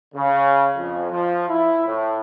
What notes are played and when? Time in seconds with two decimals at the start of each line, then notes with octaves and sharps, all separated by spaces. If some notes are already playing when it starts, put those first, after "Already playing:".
0.14 C#3
0.76 F2
1.11 F3
1.49 E4
1.87 A2